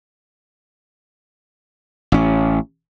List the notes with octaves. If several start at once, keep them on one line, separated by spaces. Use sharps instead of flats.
A1 C#4